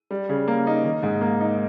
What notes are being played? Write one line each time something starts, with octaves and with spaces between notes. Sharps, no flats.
G3
C#3
A#3
D#4
D#3
G#2
A#3
D#4